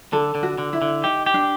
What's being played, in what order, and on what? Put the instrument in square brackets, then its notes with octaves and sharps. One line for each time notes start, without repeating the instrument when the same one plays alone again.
[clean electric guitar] D3 [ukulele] A4
[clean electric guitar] D3
[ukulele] F#4
[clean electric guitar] D3
[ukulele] E4
[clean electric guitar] D3
[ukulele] D#4 [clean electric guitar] G4
[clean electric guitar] G4
[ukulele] D4